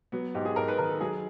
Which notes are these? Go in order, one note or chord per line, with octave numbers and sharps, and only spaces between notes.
F#3 B3
G#2 G4
G#4
G#2 A#4
B4
D#3 A#4
A4
F#3 G#4